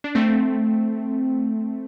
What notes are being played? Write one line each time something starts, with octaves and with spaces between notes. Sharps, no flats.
D4
A3 C4